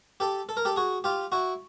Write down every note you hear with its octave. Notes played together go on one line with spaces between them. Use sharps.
G4 A4
A4
A#4
G4 A4
F#4 G#4
F4 G4
E4 F#4